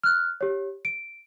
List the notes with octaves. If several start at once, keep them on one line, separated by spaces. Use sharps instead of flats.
F6 F#6
G4 C#5
D7